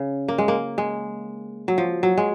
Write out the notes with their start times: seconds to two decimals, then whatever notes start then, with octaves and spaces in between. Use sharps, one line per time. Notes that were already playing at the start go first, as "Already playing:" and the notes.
Already playing: C#3
0.28 A#3
0.38 G#3
0.48 A#3
0.78 G#3
1.68 F#3
1.78 F3
2.03 F#3
2.17 G#3